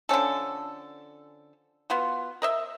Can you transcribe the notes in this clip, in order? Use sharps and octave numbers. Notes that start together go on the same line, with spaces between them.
D3 F3 C#4 A4
B3 F4 F#4
A#4 D#5 E5